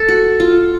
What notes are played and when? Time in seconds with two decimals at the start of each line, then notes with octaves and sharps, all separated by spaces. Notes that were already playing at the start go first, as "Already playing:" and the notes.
Already playing: A4
0.08 F#4
0.40 F4